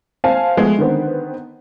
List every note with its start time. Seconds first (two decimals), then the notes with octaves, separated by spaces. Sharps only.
0.24 C4 F5 G#5 A5
0.57 F3 G#3 A3 B3
0.78 D3 D#3 B3 C4